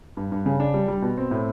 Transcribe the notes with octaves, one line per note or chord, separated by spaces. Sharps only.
G2
G2
C#3
D4
G3
G3
B2
C4
A2